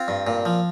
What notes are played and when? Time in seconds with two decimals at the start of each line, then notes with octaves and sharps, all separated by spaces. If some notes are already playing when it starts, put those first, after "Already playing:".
Already playing: C4 F4
0.08 G2
0.27 A#2
0.45 F3